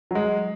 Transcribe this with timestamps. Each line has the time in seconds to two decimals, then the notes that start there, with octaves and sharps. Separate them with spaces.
0.11 F#3
0.15 G#3